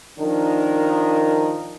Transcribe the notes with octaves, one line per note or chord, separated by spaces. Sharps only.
D#3 F3 D4 D#4 A#4